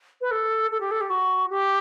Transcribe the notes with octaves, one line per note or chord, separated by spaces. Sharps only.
B4
A4
A4
G4
A4
G4
F#4
G4